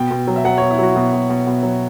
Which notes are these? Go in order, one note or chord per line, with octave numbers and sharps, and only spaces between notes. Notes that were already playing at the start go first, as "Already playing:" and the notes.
Already playing: B2 G5
B2
F#3
E5
F#3 F#5
C#5
B2
E4
F#3 F#4
B2 E4
B2
B2
B2
F#3